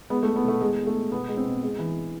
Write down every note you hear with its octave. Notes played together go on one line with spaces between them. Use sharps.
G#3 B3
A3
G#3
B3
B2 A3
E2 G#3
E2
A3
G#3
B2 B3
G#3
C4
B2
G#3
E3